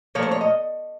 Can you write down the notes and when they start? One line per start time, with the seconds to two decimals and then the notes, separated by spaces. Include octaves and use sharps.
0.15 A#2 F3 A3 C#5
0.23 C5
0.31 C#5
0.41 D#5